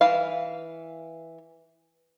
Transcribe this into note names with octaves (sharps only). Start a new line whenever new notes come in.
E3 F5